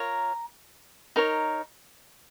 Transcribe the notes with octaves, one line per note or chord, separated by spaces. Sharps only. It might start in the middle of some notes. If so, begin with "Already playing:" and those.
Already playing: F4 A#4 C#5 A#5
D#4 A#4 C#5